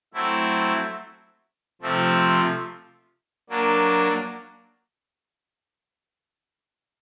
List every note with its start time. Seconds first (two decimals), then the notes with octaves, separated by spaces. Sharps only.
0.14 F#3 A3 C4 E4
1.82 C3 F3 A3 C4
3.49 F#3 A#3 D4